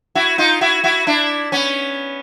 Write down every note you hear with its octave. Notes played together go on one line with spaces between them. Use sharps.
E4 F#4
D#4 F4
E4 F#4
E4 F#4
D4 E4
B3 C#4